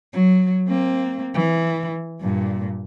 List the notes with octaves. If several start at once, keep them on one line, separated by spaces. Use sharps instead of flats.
F#3
A#3 C4
E3
G2 A#2